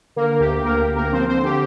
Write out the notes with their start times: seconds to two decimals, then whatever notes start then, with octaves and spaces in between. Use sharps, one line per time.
0.16 D3 A#3 A#4
0.40 D2 G4
0.64 D2 A#3 A#4
0.81 G4
0.88 D2
0.96 A#3 A#4
1.12 F3 C4 C5
1.28 C4 C5
1.36 D3
1.45 G4